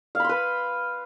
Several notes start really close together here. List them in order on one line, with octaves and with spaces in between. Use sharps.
F5 B5 C6 B4